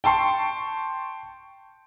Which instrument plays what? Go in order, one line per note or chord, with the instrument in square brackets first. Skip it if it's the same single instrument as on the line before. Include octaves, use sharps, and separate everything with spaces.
[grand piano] G5 A5 C6 C#6